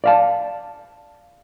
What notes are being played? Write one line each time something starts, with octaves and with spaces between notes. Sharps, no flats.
D5 F5 A5